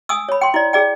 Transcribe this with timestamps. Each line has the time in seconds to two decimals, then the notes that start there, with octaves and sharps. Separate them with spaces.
0.09 G#5 D#6 E6
0.29 C#5 B5
0.41 G5 C6
0.54 E4 D5
0.73 G#4 D5 G5